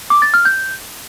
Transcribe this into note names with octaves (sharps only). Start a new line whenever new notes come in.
D6
A6
F6
G6